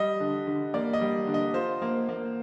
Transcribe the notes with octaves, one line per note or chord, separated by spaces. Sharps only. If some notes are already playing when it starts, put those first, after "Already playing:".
Already playing: G3 D#5
D3
D3
A#3 D5
D#5
G3
D3
D#5
F4 C5
A#3
A#3